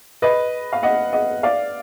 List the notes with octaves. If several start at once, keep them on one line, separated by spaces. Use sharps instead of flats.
B4 D#5
F5
D#5 F#5
D#5 F#5
D5 F5